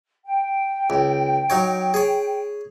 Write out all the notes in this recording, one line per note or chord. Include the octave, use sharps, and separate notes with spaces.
G5
C#2
F#3 D#4 C#5
G#4 C#5